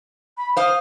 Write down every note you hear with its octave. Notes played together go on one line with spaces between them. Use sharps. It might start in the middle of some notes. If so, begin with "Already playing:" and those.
B5
C5 F5 D#6